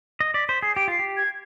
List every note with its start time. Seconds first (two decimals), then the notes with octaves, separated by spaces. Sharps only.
0.20 D#5
0.34 D5 B6
0.48 C5 B6
0.62 G#4 C7
0.75 G4 D7
0.88 F4 C7
0.99 G4
1.17 G#6